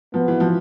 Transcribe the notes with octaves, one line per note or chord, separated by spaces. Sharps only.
F3 B3
E3
F3